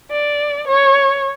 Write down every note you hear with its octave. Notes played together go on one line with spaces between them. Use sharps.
D5
C#5